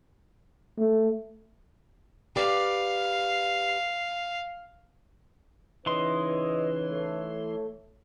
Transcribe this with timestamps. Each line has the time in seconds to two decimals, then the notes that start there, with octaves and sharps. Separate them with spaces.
0.79 A3
2.36 G4 B4 D5 F5
5.86 C#3 E3 D#4 B4 C#5 D#5 C6
6.89 A3